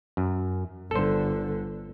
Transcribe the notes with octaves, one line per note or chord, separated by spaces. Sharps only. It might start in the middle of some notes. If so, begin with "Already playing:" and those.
F#2
G1 D3 A4 C5